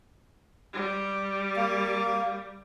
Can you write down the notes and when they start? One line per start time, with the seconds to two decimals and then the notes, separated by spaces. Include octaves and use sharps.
0.73 G3
1.56 A#3